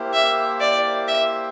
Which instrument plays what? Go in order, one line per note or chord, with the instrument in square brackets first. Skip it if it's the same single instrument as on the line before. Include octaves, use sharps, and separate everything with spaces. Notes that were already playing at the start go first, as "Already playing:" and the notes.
Already playing: [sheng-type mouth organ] A#3 E4 G4 C5
[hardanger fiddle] E5
D5
E5